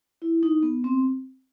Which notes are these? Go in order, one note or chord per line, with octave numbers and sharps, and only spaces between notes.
E4
D#4
B3
C4